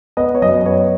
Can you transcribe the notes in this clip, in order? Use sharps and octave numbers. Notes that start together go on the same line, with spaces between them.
B3 D#5
C#5
F#2 D#5
B3 C#5